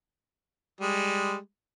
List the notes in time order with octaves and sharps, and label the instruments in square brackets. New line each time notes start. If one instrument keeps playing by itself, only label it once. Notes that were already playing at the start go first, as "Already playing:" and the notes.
[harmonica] G3 G#3